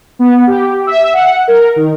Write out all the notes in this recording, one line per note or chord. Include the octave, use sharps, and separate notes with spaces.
B3
G4
E5
F#5
A#4
D#3